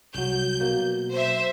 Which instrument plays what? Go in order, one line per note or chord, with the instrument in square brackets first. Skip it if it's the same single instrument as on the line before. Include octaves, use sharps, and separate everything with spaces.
[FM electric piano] C2 F#3 [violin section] G6
[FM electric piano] B2 F#3 A#3
[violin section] C5 E5